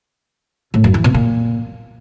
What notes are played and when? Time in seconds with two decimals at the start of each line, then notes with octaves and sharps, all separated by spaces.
0.74 A2
0.84 F#2
0.94 E3
1.04 B2
1.14 A#2